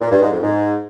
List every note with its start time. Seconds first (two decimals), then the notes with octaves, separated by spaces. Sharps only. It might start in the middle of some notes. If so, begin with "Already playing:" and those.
0.01 A#2
0.11 G2
0.22 G#2
0.32 F2
0.43 G#2